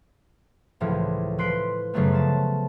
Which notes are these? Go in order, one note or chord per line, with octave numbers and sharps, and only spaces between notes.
C#2 A2 E3 F3
F3 B4 C6 C7 D7
F#2 C#3 F#3 A3 B3
F3 A5